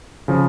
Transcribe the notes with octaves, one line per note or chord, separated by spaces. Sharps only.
C#3 F3